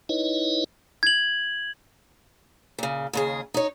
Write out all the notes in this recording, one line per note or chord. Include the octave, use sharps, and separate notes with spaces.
D#4 E4 B4 C#5 D#5
G#6 F#7
A#2 C#3
D#2 C#3 G#4
D#4 C#5